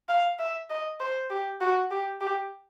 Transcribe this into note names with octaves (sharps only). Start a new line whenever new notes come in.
F5
E5
D#5
C5
G4
F#4
G4
G4